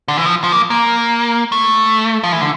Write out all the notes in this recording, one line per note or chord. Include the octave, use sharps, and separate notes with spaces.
D3
E3
F3
F3
A#3
A#3
A3
F3
E3
D3